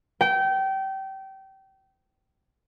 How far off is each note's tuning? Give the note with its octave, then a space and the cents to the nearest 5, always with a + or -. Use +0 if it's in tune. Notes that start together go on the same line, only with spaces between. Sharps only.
G5 -25